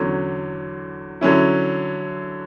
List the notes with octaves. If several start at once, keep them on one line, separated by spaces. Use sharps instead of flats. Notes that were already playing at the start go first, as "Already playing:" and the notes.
Already playing: E2 D3 F#3 C#4
D3 F#3 C#4 E4